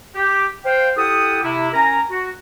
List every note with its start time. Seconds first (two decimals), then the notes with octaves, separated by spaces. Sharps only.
0.15 G4
0.66 C5 F5 G5
0.97 E4 G4 A4 F#5 G5 D#6
1.43 C3 E4
1.73 C#4 A#4 G#5 A#5
2.11 F#4